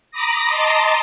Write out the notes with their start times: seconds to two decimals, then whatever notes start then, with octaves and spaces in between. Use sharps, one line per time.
0.11 A#5 B5 D6 D#6 A#6
0.46 D#5 A5 A#5 C6 D6